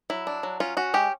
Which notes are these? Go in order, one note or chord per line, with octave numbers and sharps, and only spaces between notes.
F#3 E4
D4
F#3
C#4 F4
C#4 F#4
G#3 G4